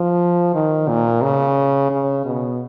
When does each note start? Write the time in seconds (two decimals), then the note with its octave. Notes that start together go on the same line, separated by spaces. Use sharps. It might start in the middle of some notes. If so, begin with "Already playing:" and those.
Already playing: F3
0.54 D#3
0.88 A#2
1.22 C#3
1.91 C#3
2.25 B2